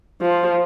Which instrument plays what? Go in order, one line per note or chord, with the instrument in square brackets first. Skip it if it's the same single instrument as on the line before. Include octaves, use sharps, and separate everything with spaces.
[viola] F3